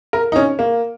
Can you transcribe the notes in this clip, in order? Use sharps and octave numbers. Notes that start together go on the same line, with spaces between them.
A#4
D#4
C#4
A#3